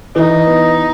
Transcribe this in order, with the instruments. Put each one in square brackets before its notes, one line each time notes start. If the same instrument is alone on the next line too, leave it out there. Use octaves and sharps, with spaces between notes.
[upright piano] E3 [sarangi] D#4
[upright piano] B3